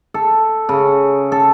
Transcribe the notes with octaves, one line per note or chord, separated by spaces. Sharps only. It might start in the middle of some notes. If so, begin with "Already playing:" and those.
A4
C#3
A4